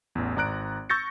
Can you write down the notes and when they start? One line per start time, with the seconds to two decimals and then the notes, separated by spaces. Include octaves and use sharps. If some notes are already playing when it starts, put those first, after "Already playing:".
0.15 A1 E2
0.36 G#1 D5 A#5 F#6 D7
0.89 C#6 E6 G6 A6 A#6 C#7